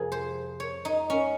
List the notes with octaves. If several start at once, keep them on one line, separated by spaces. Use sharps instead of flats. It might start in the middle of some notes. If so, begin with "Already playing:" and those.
Already playing: F2 C3 F3 G#4 A#4
C5
C#5
D#4
C#4